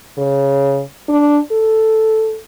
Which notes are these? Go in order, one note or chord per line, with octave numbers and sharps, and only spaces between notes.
C#3
D4
A4